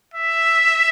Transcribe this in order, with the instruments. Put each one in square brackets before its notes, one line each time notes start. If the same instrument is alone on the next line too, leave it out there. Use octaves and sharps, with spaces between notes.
[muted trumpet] E5